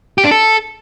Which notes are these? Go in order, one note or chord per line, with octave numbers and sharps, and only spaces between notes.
G4
D4
A4